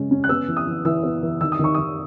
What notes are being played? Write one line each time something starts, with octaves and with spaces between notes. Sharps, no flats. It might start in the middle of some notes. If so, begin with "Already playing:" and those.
Already playing: C#3 G#3 C#4
C#4
F#6
B3 E6
E3
D#6
E3
E3 E6
B3
E3
D#3 E6
D#6
D#3 C#6
D#3 D#6